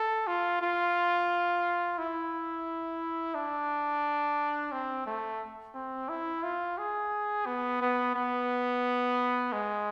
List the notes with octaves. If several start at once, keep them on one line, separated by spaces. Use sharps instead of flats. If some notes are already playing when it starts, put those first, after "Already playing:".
Already playing: A4
F4
F4
E4
D4
C4
A3
C4
E4
F4
G#4
B3
B3
B3
G#3